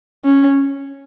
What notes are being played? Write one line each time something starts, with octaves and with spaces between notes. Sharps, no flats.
C#4